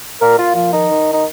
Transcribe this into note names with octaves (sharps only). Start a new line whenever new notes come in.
A#2 A#4
A#2 F4
F3 F4
D#3 D#4
D#3
D#4